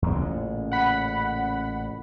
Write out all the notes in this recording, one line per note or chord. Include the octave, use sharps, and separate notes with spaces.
E2 A#3 C4
A1 A#2 C#3
F#5 B5